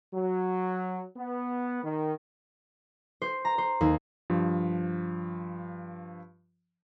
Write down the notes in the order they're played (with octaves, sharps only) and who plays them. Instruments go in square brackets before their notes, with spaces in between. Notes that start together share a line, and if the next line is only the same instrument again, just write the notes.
[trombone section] F#3
B3
D#3
[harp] C5
A#5
C5
D#2
[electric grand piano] G2 F3